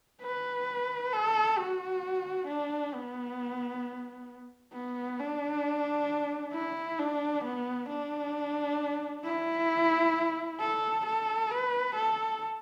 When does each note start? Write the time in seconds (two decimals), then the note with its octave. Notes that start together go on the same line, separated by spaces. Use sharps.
0.22 B4
1.13 A4
1.58 F#4
2.48 D4
2.93 B3
4.73 B3
5.19 D4
6.53 E4
6.99 D4
7.45 B3
7.89 D4
9.24 E4
10.60 A4
11.06 A4
11.51 B4
11.96 A4